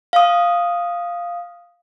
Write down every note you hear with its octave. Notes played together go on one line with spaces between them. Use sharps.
F5 D#6